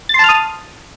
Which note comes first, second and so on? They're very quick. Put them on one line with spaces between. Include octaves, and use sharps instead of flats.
A6 C6 A5 F6 D#6